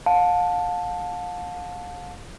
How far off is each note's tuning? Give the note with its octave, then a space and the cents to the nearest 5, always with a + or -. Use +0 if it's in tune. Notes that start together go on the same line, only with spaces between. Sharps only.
F5 +40 A5 +0